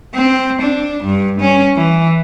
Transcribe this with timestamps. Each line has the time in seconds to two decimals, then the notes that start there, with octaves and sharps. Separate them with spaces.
0.15 C4
0.61 D4
1.04 G2
1.41 C#4
1.77 E3